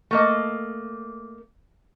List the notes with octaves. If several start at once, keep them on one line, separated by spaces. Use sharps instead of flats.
A3 A#3 D#5